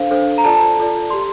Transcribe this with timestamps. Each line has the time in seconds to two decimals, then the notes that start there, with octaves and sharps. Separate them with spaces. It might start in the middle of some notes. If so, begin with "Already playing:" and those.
Already playing: D4 A4 C5 F5
0.11 D4 A4 C5
0.38 A#5
0.44 F4 A4 D5 A5
0.77 F4 A4 D5
1.09 G4 D5 C6